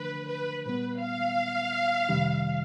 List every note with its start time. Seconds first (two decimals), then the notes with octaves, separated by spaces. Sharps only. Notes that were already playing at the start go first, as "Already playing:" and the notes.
Already playing: D3 F3 A3 D4 B4
0.29 B4
0.66 A#2 G3 B3 B4
1.01 F5
2.09 F2 C3 D#3 G3